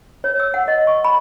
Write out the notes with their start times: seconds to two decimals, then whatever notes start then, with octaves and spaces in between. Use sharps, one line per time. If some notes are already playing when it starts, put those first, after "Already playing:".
0.24 C#5
0.40 E6
0.54 F#5
0.68 D#5
0.87 C#6
1.04 B5